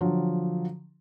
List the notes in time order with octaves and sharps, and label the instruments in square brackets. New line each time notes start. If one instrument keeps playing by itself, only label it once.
[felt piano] D3 F3 F#3